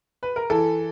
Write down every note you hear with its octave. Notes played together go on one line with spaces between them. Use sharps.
B4
A#4
E3 A4